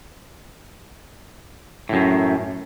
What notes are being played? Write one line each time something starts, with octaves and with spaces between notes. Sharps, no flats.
F#2 A2